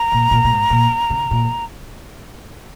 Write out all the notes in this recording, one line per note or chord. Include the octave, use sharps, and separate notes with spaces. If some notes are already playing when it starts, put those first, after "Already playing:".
Already playing: A#5
A#2
A#2
A#2
G#2
A#2
C#3
A#2